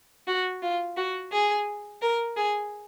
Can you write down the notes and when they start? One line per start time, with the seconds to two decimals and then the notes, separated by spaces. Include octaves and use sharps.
0.27 F#4
0.62 F4
0.97 F#4
1.32 G#4
2.02 A#4
2.37 G#4